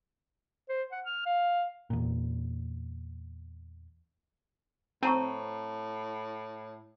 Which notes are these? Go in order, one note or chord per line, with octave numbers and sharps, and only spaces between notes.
C5
F#5
F6
F5
E2 A#2
A2 C4 A5 A#5 C#6